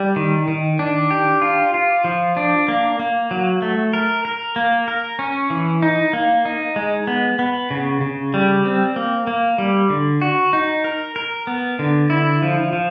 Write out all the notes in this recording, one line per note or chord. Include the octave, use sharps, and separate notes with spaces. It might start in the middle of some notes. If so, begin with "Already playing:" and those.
Already playing: G3
D#3
D#3
D4
G4
F4
F4
F3
D4
A#3
A#3
F#3
A3
A#4
A#4
A#3
A#4
C#4
E3
D#4
A#3
D#4
G#3
B3
B3
C#3
C#3
G3
C4
A#3
A#3
G3
D3
F#4
D#4
A#4
A#4
B3
D3
E4
F3
F3